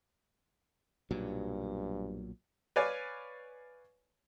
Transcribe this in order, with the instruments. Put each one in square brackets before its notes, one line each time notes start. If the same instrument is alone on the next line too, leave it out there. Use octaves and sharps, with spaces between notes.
[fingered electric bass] B1 A#2 F#3 [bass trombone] G2
[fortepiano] B4 C#5 D5 F5 G#5